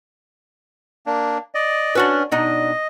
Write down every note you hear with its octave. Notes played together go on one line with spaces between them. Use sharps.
A#3 D4
D5 D#5
C#4 D4 F#4 B4
B2 D4 D#4 D#5